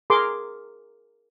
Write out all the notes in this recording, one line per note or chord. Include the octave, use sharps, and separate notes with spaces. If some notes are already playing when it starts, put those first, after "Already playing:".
G#4 A#4 C6 D6